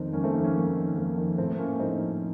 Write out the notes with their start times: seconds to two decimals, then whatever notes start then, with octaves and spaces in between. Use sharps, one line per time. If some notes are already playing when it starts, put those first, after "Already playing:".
Already playing: F2 D#3 C4 D#4
0.13 F2 A#3 C#4
0.24 A3 C4
0.34 D#3 A#3
0.44 A#3 C#4
0.55 F2
0.76 D#3
0.97 F2 A#3
1.18 D#3
1.38 A2 A3 C4
1.59 F3 A#3 C#4
1.79 A2 C4 D#4
2.00 F3